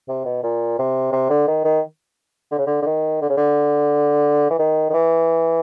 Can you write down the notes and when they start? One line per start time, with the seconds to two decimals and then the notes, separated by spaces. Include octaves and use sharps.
0.09 C3
0.25 B2
0.43 A#2
0.79 C3
1.12 C3
1.30 D3
1.48 D#3
1.65 D#3
2.51 D3
2.58 C#3
2.67 D3
2.82 D3
2.86 D#3
3.21 D3
3.29 C#3
3.37 D3
4.51 E3
4.59 D#3
4.90 D#3
4.94 E3